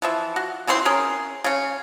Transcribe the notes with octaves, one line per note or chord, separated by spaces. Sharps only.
E3 F3 E5
F#4
C#3 E3 C4 C6
C#4 G#4 A#4
C#3 C#4